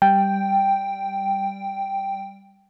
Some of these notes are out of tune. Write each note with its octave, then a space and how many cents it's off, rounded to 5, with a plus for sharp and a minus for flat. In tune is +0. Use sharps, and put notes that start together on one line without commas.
G3 +0 G5 +0